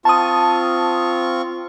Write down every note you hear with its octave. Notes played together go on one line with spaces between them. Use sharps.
C4 F4 A5 C#6 D#6